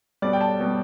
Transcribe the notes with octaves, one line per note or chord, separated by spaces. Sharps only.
B2 G3 D5
G5
A5
B2
G3